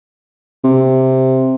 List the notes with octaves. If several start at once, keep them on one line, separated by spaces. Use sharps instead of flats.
C3